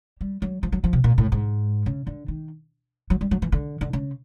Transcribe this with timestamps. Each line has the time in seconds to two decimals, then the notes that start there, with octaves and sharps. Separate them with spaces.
0.21 G3
0.42 F#3
0.63 F3
0.72 F#3
0.84 F3
0.93 C3
1.04 A#2
1.18 A2
1.32 G#2
1.86 C#3
2.07 D3
2.28 D#3
3.10 F#3
3.21 G3
3.31 F#3
3.42 E3
3.52 D3
3.81 D3
3.93 C#3